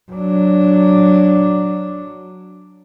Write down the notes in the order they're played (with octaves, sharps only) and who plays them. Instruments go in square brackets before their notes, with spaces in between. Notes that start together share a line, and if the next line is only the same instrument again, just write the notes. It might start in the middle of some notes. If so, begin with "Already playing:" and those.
[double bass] F#3 D4